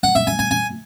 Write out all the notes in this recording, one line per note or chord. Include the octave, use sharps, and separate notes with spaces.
F#5
E5
G#5
G#5
G#5